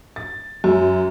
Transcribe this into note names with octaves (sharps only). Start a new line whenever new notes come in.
A6
F#2